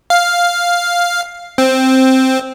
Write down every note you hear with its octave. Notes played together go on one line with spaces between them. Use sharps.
F5
C4